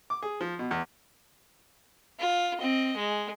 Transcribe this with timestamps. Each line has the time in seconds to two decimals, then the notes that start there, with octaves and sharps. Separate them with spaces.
0.10 D6
0.23 G#4
0.41 F3
0.59 B2
0.71 E2
2.19 F4
2.58 C4 D#5
2.96 G#3